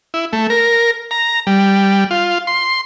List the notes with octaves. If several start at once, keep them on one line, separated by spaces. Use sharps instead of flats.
E4
A3
A#4
A#5
G3
F4
C6